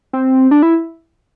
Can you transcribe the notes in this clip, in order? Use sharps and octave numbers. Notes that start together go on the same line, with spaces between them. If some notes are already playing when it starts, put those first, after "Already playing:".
C4
D4
E4